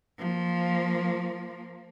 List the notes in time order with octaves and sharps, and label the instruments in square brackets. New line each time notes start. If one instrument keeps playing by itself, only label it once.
[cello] F3 A#3